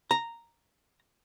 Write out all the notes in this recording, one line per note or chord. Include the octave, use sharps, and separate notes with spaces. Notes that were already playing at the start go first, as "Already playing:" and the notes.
A#5